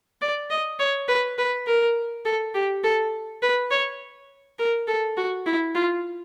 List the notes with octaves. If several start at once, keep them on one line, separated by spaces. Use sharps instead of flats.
D5
D#5
C#5
B4
B4
A#4
A4
G4
A4
B4
C#5
A#4
A4
F#4
E4
F4